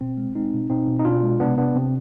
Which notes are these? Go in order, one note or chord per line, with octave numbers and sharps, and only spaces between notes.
B2 C4
G#3
G#3 C4 D#4
B2
B2 C4 D#4
B2
D#4
B2 D4 F4
G#3
C3 B3 D4
C3 B3 D4
C3 C4